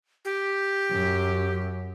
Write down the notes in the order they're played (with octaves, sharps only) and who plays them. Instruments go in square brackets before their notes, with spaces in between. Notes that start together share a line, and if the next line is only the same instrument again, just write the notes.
[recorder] G4
[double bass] F#2